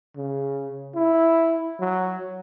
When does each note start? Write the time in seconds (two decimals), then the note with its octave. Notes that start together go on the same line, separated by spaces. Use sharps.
0.16 C#3
0.95 E4
1.80 F#3